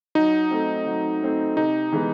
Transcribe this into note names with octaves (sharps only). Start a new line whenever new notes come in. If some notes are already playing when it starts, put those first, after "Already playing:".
F#3 D#4
A3 C4
F#3
A3 C4
C3 D#4
E3 G#3 B3